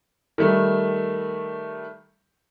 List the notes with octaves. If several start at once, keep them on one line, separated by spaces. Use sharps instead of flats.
D#3 G3 A3